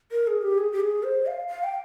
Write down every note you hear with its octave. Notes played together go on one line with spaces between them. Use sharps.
A#4
G#4
G4
G#4
G4
G#4
C5
F5
F5
G5